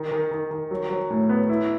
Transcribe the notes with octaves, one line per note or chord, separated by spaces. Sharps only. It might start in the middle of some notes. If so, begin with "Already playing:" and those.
Already playing: D#3
D#3
D#3
D#3
F#3
F#3
A2
B3
E4